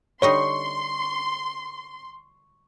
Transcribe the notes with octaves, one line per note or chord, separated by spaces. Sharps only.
D3 G3 D#4 C#5 C6 C#6